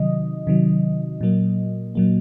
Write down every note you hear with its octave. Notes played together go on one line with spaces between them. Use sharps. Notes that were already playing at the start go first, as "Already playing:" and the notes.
Already playing: C3 D#3 F#3 D#5
C3 D#3 F#3
A#2 F#3 A#3
A#2 F#3 A#3